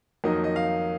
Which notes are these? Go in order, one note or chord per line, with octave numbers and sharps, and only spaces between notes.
F2 D#3 F#3 A#3 D#4 D#5
D#5
F5